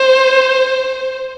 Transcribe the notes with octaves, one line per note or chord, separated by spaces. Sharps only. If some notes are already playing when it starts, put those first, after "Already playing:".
Already playing: C5